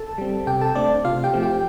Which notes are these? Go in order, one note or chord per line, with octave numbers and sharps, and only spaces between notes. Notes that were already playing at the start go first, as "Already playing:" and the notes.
Already playing: A4 A5
G3 C4
C3 G4 G5
A4 A5
A3 C4 D4 D5
C3 F4 F5
G4 G5
F3 A3 C4
G4 G5